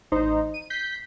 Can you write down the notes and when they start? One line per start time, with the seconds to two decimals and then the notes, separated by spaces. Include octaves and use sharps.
0.12 A1 D#4 C5
0.54 D#7
0.70 G6 B6 C7